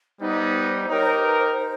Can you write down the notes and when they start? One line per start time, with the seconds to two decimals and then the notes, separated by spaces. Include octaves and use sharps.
0.20 G3 B3 D#4 C5
0.88 D#4 G4 A#4 C#5
1.06 C5
1.23 B4
1.40 C5
1.58 C5